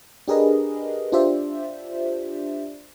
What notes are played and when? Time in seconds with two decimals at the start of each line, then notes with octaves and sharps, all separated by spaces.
0.28 D4 G4 G#4 A#4 B4 D#5
1.12 D4 F4 G4 C5 D5 E5